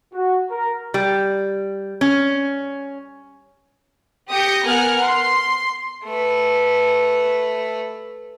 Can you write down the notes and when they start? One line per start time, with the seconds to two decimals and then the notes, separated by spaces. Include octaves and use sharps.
0.14 F#4
0.51 A#4
0.94 G3
2.01 C#4
4.30 G4 D#6 G6 A#6 C#7
4.66 B3 A#4 F#5 G#5 F6
5.04 C6
6.05 A3 B4